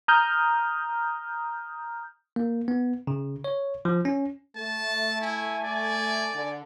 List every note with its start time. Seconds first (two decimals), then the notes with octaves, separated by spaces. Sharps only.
0.08 A#5 D#6 F6 G6
2.36 A#3
2.68 B3
3.07 C#3
3.44 C#5
3.85 F3
4.05 C#4
4.56 A3 A5
5.21 E4 G#5
5.64 D5
6.33 D3